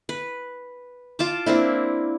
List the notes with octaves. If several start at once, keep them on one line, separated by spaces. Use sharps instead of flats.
B4
F4 A5 D6
A#3 C4 D4 E4